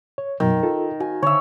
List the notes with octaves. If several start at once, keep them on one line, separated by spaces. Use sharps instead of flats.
C#5
F#2 B2 D#3 F#3
F4 A4
F#4 G#5
D3 C#5 E5